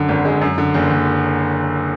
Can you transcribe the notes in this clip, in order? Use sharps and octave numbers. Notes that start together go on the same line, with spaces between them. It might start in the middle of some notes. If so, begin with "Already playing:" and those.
Already playing: F#2 D3
G#1
G#3
F#2
D3
F#1
F#1